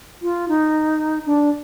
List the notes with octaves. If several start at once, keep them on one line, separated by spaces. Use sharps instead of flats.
F4
D#4
D4